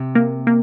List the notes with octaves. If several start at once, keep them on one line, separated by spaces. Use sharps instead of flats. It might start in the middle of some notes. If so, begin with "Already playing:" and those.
Already playing: C3
A#3
A#3